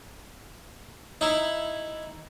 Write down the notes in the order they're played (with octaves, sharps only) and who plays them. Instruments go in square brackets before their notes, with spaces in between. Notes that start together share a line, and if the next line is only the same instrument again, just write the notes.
[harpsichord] D#4 E4